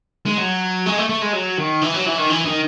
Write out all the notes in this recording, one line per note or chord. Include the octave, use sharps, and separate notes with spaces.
G#3
F#3
G#3
A3
A3
G#3
F#3
D#3
E3
F#3
E3
D#3
E3
D#3